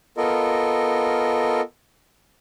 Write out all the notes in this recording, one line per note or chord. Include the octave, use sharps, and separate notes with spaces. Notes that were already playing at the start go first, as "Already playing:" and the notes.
B3 F4 A4 A#4 D#5